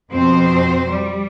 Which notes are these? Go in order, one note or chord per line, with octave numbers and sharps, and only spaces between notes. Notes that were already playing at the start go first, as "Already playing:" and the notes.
F2 B2 C4 C5
G3